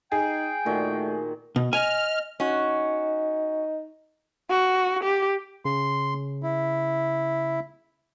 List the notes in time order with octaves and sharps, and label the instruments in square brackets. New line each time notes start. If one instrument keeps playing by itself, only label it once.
[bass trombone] D#4 [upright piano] G#4 [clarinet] G5
[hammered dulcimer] A#2 D#3 F#4 [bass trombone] A3
[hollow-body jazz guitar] B2
[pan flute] D#5 [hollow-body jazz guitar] G#5 [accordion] F6
[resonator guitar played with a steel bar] C#4 F#4 [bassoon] D#4
[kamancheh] F#4
G4
[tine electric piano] C#3 [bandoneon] C6
[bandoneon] E4